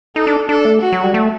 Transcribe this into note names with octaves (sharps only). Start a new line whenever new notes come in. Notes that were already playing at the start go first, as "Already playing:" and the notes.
D#4 A4
D4
D4 A4
A3
F#4
F#3
G3
A3